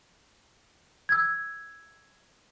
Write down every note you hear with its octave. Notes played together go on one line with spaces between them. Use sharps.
E6 G#6